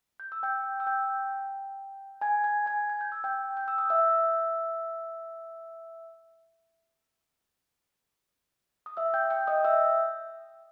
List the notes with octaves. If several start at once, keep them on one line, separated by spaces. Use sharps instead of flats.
G6
E6
G5 G6
E6
G5 G6
G#5 G#6
G#5 G#6
G#5 G#6
G#6
G6
E6
G5 G6
G6
E6
D#6
E5 E6
D#6
E5 E6
G5 G6
G5 G6
D#5 D#6
E5 E6